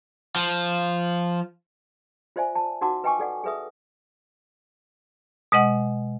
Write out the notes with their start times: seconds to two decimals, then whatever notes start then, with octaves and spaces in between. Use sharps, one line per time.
0.36 F3
2.36 F4 C5 D5 E5 G#5
2.55 A5
2.81 D#4 F#4 A#4 F#5 A5 D6
3.04 B4 D#5 G5 G#5 C#6 D6
3.19 A4 D5 F#5
3.44 G#4 A4 B4 E5 D#6
5.52 B2 G#3 D#5 F#5